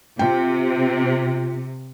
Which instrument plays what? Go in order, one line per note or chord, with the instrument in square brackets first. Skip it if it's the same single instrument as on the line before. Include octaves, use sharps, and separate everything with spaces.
[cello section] C3 [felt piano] F4 G5